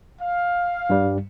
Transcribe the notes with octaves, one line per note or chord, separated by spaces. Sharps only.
F5
G2 G3